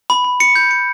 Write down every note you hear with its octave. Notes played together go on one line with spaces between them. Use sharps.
B5
B5
C#7
G6
C#7